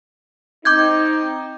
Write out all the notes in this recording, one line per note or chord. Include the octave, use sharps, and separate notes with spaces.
C4 D#4 D6 G6 G#6